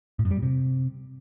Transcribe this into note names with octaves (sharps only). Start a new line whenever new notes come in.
A2
F#2
G3
A#2
C3